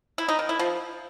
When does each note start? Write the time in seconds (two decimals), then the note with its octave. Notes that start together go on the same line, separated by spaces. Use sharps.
0.18 E4
0.28 D#4
0.39 D#3
0.49 E4
0.59 F3